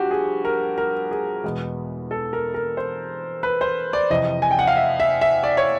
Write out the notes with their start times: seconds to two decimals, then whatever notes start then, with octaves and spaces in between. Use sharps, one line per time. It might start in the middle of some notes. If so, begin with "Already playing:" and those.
Already playing: G2 F3 F#4 G4
0.11 G#4
0.45 A#4
0.78 A#4
1.11 G#4
1.44 E2 B2 G#3 B3
2.11 A4
2.33 A#4
2.54 A#4
2.77 C5
3.43 B4
3.61 C5
3.93 D5
4.10 F2 C3 E3 D#5
4.42 G#5
4.51 G5
4.59 F#5
4.67 F5
4.77 E5
5.00 E5
5.21 E5
5.43 D5
5.57 C#5